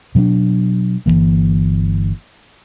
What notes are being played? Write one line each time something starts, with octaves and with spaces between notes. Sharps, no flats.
B2 F#3 C#4 D4
G1 F2 E3 A#3